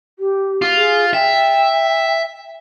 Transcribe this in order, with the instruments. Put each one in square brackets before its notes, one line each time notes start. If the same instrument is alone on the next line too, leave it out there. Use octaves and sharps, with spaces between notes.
[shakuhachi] G4
[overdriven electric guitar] F4
[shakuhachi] G#4
[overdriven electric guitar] E5 [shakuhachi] G5